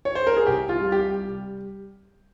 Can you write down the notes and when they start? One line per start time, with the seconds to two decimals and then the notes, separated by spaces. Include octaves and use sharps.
0.05 C#5
0.15 C5
0.27 A#4
0.37 G#4
0.47 C2 G4
0.69 F4
0.81 G3
0.92 G4